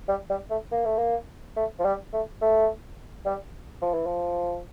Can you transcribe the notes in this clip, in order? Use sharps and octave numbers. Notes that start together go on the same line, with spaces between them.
G3
G3
A3
A#3
A3
A#3
A3
F3
G3
A3
A3
G3
F3
E3
F3